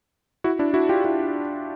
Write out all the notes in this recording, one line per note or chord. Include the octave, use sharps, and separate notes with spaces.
E4 F#4
D4 E4
E4 F#4
F4 G4
E4 F#4